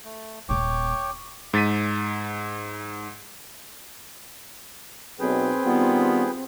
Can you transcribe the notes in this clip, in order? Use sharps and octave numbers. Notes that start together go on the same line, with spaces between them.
A3
D#1 A#2 C#5 G5 C#6 D6
G#2 A6 B6 D#7
B1 C4 G#4 B4 G5
D#3 G3 B3 F4